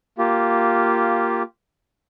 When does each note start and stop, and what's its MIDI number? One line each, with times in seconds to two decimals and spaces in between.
0.18 1.43 58
0.18 1.43 65
0.18 1.43 67